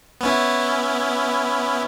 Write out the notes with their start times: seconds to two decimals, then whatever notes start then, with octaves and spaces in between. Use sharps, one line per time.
0.21 B3 C#4 E4